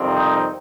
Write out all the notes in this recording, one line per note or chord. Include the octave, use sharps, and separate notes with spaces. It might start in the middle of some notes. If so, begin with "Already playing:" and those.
Already playing: F2 C3 D#3 G3 C4
D#4